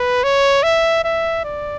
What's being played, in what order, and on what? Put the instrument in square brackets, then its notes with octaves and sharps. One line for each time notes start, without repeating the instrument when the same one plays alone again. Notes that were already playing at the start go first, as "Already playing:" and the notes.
Already playing: [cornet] B4
C#5
E5
E5
D5